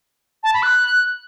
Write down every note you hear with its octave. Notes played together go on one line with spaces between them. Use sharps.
A5
B5
F#6